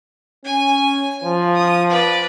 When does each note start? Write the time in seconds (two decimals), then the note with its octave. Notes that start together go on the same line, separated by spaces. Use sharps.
0.45 C#4 G#5
1.23 F3
1.55 D#6
1.90 B4 D5